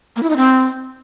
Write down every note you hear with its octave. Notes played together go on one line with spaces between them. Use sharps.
A#3
E4
D#4
C4